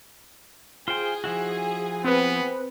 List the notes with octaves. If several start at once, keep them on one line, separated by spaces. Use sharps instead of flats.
F4 G#4 C5 G5 G#5
F3 E4 F#4
B3 C4 B4